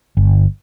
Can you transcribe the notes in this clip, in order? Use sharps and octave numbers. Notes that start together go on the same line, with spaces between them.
G1